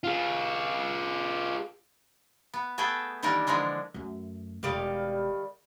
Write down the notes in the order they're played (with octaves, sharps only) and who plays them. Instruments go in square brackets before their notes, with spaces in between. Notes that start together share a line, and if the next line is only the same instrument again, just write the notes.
[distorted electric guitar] F4 G#4
[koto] B3
A3 B3 G#4 A4 E5 G5
D#3 E3 G3 A#3 D4
D3 E3 F3 G#3 D4
[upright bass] F#2 A3
[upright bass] E1 [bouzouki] D#3 G3 F5